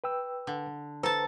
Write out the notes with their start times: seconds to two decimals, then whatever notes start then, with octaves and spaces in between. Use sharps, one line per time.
0.04 B4 G5 E6
0.47 D3
1.03 A4 B4 C5 A5 A#5